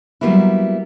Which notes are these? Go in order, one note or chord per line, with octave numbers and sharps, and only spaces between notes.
F#3 G3 A#3 B3 E4